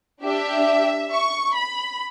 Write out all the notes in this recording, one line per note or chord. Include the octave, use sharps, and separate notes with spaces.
D4 G4 E5
C#6
B5